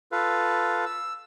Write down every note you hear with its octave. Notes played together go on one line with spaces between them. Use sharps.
F4 A4 B4 F5
E6